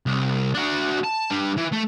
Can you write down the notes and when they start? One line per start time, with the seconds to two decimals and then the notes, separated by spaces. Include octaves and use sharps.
0.06 C2
0.54 D4 F#4
1.04 A5
1.31 G3 D4
1.58 E3
1.72 A3